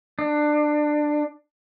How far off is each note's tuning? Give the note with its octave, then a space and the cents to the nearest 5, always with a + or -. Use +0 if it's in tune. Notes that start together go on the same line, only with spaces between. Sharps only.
D4 +20